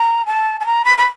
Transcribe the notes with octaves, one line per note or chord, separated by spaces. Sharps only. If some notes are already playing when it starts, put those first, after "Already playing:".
Already playing: A#5
A5
A5
A#5
B5
B5